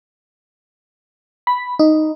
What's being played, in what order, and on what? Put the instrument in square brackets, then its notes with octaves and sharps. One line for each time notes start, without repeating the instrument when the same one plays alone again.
[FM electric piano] B5
D#4